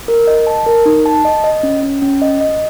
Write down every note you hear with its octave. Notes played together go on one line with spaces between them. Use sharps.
A#4
D#5
A5
A#4
D#4
A5
D#5
D#5
C#4
C#4
C#4
D#5
D#5